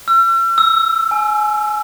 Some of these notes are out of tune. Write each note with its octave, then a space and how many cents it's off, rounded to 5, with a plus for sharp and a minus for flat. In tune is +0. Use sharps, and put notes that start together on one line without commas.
E6 +45
E6 +5
G#5 +25